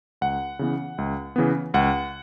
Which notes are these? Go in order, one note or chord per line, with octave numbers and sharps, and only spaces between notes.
C#2 F#5
C#3 E3 B3
C#2
C#3 E3 B3
C#2 F#5